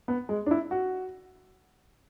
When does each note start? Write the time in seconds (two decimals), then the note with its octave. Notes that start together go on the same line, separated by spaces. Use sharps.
0.08 B3
0.29 G#3
0.46 D4
0.51 E4
0.71 F#4